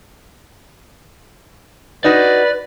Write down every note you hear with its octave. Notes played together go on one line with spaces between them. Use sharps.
D#4 F#4 B4 D5